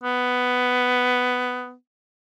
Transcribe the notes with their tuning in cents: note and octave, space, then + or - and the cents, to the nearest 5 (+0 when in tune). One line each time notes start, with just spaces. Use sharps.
B3 +10